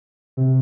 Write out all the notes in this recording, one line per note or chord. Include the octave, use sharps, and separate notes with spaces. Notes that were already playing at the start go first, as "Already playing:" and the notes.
C3